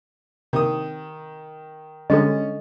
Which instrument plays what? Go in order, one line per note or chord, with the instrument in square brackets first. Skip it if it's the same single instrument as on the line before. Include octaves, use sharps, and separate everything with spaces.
[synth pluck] C3 [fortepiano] D#3 D#6
[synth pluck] D3 G3 G#3 [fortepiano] C#4 [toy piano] A4 D#5